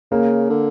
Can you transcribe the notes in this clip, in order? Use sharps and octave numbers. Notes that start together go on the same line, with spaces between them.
C#3 A#3
D3